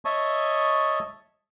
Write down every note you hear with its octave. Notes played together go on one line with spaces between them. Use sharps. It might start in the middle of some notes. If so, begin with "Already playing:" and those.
C#5 D#5 E5 A5 C#6 D#6